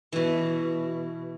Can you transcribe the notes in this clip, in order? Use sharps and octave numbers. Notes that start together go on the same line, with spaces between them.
B2 E3